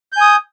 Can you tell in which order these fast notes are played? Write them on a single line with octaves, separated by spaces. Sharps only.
G6 G#5 D#6